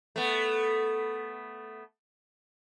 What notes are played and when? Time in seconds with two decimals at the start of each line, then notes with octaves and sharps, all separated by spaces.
0.16 A3 B3